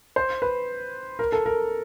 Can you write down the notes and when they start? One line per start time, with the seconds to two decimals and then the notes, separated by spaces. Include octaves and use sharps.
0.16 C5
0.42 B4
1.19 A#4
1.32 A4
1.46 A#4